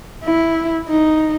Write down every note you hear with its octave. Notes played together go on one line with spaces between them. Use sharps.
E4
D#4